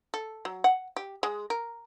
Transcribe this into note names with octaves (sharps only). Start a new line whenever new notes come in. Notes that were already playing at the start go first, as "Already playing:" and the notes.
A4
F#3
F#5
G4
G#3
A#4